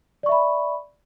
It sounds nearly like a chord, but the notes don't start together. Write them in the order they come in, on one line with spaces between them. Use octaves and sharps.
D5 C#6 E5 B5